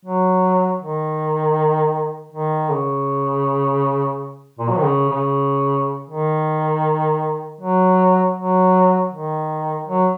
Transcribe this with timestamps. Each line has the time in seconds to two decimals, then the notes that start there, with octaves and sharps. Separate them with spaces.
0.06 F#3
0.81 D#3
2.32 D#3
2.70 C#3
4.59 A#2
4.70 F#3
4.77 D#3
4.84 C#3
5.10 C#3
6.10 D#3
7.61 F#3
8.37 F#3
9.13 D#3
9.88 F#3